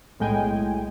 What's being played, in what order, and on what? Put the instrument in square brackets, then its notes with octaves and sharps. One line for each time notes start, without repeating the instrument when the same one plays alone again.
[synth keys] B1 A2 G#3 G5 G#5